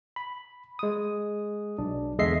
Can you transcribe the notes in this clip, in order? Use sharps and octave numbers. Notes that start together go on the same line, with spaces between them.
B5
G#3 D#6
B1 D4
E2 D3 G#3 D#5 E5 C7